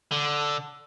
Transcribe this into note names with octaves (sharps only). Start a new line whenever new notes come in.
D3